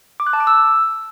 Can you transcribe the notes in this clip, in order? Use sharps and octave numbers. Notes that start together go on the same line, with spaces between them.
D6
F#6
A5
D6
E6